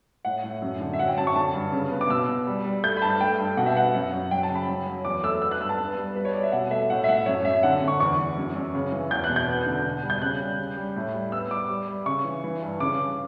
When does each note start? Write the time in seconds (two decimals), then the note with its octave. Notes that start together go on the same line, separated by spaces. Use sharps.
0.25 A2 F#5
0.44 A2
0.62 F#2
0.80 D3
0.93 E5
0.99 F#3 F#5
1.08 G5
1.18 F#2 A5
1.27 C#6
1.36 D3 A5
1.54 G2
1.72 C#3
1.91 B3
2.01 D6
2.09 B2 E6
2.28 B2
2.47 G3
2.64 G3
2.84 A3 G6
2.97 B5
3.02 G2 A5
3.21 A3 G5
3.38 G2
3.57 B2 F#5
3.66 E5
3.76 B3 F#5
3.94 F#2
4.13 F#2
4.31 F#3 G5
4.43 A5
4.50 C#3
4.55 B5
4.68 F#2
4.86 F#3
5.05 E2 D6
5.23 A3 E6
5.42 B3 E6
5.51 F#6
5.61 G2 E6
5.69 A5
5.79 B3
5.98 G3
6.15 G3 B4
6.25 C#5
6.34 G3 D5
6.43 E5
6.52 B2 F#5
6.71 A3 E5
6.90 A2 F#5
7.04 E5
7.08 A2 F#5
7.17 E5
7.26 F#2 C#5
7.44 F#2 E5
7.63 D3 F#5
7.82 D3
7.88 C#6
8.00 E2 C#6
8.18 E2
8.37 F#2
8.55 F#2
8.74 C#3
8.92 E3
9.11 E2 G6
9.24 F#6
9.29 B2
9.36 G6
9.47 B3
9.66 D3
9.84 B2
10.03 G3
10.10 G6
10.22 C#3 F#6
10.40 G3
10.58 C#3
10.77 G3
10.96 A2
11.14 G3
11.32 B3 E6
11.51 G3 D6
11.70 G3
11.88 G3
12.06 C#3 C#6
12.24 E3
12.44 E3
12.62 G2
12.80 C#3 D6
12.99 C#3